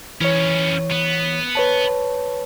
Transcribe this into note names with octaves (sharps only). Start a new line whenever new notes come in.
E3 B3 C#4 C#5
B3
B4 C#5 A5